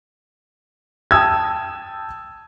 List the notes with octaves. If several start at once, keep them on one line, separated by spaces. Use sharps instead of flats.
G5 A5 D#6 E6 G#6